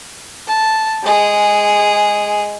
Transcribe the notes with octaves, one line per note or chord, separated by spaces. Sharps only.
A5
G#3 G#4